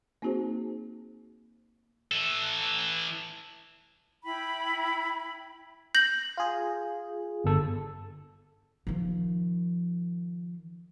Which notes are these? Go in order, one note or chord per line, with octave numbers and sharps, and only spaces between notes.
A#3 C4 D#4 F#4 G#4 C5
E3 A4
E4 G5 B5
G6 A#6 F#7
F4 G#4
G1 A4
D#3 F3